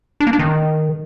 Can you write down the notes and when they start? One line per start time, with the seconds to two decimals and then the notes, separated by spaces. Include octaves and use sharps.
0.20 D4
0.27 A#3
0.33 D4
0.39 D#3